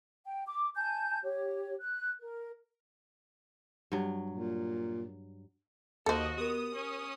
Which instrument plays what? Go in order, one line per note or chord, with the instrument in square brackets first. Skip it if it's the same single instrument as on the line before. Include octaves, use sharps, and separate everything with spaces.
[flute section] G5
D6
G#5 A5 G6
G4 C#5
F#6
A#4
[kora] G2 F#3
[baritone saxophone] A#2
[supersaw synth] D#2 D#5 [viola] A#3 F#4 [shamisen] A4 C5
[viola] B3 [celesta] G4 A#4 [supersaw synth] D#6
[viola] C#4